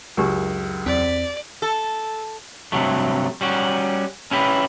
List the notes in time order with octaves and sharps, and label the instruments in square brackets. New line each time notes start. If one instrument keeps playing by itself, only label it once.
[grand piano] C#2 F#2 [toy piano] D4 G4 A#4
[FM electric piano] E2 C4 B6 [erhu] D5
[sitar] A4
[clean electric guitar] G2 C3 F#3 A3
G3 C#4 F#4
C#4 E4 G4 B4